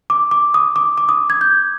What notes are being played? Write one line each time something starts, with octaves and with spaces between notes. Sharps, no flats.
D6
D6
D#6
D6
D6
D#6
G#6
G6